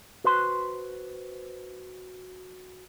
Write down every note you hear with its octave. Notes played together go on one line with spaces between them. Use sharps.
F#4 B4 C5 C6